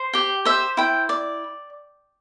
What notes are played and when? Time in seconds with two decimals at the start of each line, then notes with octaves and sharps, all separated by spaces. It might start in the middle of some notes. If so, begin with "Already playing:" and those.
Already playing: C5
0.13 G4 G5
0.45 C5 E5
0.77 E4 G5
1.09 D5